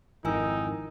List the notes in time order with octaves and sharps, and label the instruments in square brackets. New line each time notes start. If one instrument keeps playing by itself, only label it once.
[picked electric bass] G#1 F2 [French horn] D#3 [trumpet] D#4 [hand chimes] E4 G#5 E6